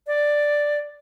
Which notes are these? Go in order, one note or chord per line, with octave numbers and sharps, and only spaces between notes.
D5